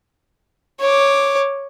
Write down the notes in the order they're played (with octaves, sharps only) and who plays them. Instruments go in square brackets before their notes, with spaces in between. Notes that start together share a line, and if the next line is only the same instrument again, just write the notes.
[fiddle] C#5 D6